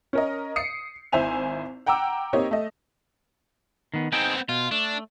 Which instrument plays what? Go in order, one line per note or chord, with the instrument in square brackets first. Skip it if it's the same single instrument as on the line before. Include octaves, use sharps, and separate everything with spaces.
[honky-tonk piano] C#4 A#4 D#5
D#6 C7 C#7
G#1 E4 C5 E5 G#5 F7
F#5 G5 A#5 D6 E6
A#3 C4 D#4 G4 C#5 D#5
A3 D#5
[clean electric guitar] D#3 B3
[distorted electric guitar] B3 C4 [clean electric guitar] D#4 G#4 G5
[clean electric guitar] B2 [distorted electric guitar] F4
[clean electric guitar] A3 [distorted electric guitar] D4